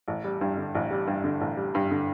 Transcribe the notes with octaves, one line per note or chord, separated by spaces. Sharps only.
A1
G3
G2
D3
A1
G3
G2
D3
A1
G3
G2
D3